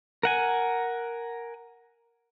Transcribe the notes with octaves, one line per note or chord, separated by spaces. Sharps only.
A#4 F#5 G#5